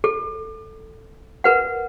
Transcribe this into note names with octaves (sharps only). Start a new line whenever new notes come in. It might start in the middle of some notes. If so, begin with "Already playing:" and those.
A4
A#4 B4 F#5